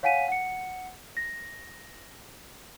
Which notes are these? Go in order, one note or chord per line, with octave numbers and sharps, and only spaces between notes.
C#5 F5 F#5 G#5 B6 D#7
F#5 C#7
A#6